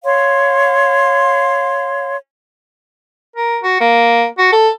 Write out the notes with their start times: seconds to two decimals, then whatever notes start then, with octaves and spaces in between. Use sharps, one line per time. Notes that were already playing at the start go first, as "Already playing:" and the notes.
0.04 C#5 F5 C6
3.36 A#4
3.63 F#4
3.80 A#3
4.38 F#4
4.52 A4